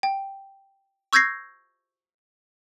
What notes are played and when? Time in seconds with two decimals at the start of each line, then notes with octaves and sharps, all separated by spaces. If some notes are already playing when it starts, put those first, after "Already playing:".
0.03 G5
1.13 C#6 E6 G6 G#6 A#6 C7